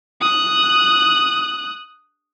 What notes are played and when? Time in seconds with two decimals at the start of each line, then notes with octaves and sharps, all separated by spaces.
0.21 D#6 F#6